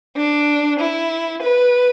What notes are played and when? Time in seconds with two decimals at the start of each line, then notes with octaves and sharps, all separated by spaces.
0.17 D4
0.80 E4
1.42 B4